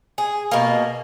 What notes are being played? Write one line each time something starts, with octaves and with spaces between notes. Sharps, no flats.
G#4
B2 A#3